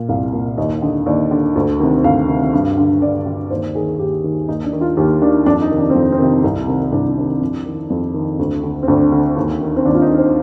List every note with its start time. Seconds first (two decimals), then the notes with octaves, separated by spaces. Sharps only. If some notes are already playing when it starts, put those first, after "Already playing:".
Already playing: A#2
0.09 C2 F5
0.33 A#2
0.58 D#2 D#5
0.82 D3
1.06 D#2 D5
1.31 D3
1.56 D2
1.80 C3 D#3
2.04 D2 F5
2.29 C3 D#3
2.53 G2
2.77 D3
3.02 G2 D5
3.26 D3
3.50 D#2 C5
3.75 D#3 G#4
3.99 D#2 G4
4.24 D#3
4.48 D#2 D#4
4.65 D4
4.73 D#3
4.81 F4
4.97 D#2 G4
5.21 D#3 D4
5.46 F2 D4
5.62 D#4
5.71 C3 D#3
5.79 D4
5.90 C4
5.95 F2
6.12 C4
6.19 C3 D#3
6.44 C2
6.68 C3 D#3
6.92 C2 D4
7.17 C3 D#3
7.41 F2
7.66 D#3
7.90 F2
8.14 D#3
8.39 D2
8.64 D3
8.83 C4
8.88 D2 D4
9.12 D3
9.37 D#2
9.61 D#3
9.76 C4
9.85 D#2 D4
9.95 F4
10.02 D#4
10.10 D#3
10.18 C5